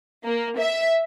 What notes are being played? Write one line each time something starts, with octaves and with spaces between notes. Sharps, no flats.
A#3
E5